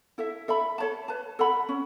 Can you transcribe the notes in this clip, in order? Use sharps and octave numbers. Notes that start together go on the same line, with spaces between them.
E4 A4 E5
A4 E5 B5
A4 C#5 A5
B4 A5
A4 F#5 B5
C#4